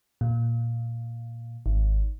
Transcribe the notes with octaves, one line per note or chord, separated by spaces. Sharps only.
A#2
G#1